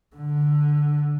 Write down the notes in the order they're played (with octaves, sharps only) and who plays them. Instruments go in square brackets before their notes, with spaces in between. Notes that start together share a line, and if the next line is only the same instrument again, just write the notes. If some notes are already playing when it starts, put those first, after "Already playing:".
[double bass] D3